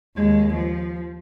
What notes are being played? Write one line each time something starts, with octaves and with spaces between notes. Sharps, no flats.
D#2 G#3
F3